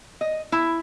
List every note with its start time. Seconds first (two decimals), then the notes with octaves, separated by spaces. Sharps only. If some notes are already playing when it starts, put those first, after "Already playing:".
0.21 D#5
0.52 E4